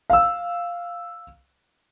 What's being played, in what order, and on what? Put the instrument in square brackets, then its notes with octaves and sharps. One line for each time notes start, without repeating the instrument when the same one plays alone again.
[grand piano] F5 E6